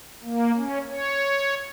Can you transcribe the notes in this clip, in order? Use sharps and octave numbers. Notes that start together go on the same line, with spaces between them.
A#3
C#4
C#5